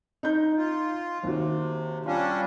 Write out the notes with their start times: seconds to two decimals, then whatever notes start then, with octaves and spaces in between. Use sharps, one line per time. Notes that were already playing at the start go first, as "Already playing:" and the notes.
0.23 D#4 G6
0.57 F4
1.23 D#2 C3 F#4
2.06 G3 C#4 D4 F4